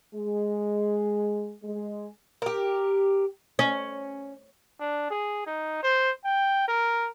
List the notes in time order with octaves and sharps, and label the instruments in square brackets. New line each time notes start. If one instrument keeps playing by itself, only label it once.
[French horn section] G#3
G#3
[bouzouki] G4 A#4
[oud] C#4
[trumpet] D4
G#4
D#4
C5
G5
A#4